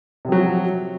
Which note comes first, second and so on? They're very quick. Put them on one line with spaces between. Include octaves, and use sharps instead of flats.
C3 F3 F#3